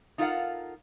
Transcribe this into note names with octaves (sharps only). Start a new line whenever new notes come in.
D#4 F4 A4 A#4 F5 F#5